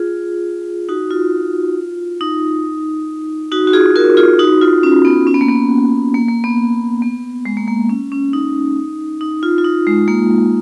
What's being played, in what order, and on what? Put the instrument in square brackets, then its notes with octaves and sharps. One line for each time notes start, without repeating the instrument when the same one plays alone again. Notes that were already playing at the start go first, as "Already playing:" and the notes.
Already playing: [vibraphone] F4 G#4
D#4 F#4
F4
D#4
D#4 F#4
F#4
F4 G#4
F#4 A#4
F4 G#4
D#4 F#4
F4
C#4
B3
C#4
B3
A#3
B3
A#3
A#3
B3
B3
G#3
A#3
A#3
C#4
C#4
D#4
D#4
F4
F4
D#4
G#3
A#3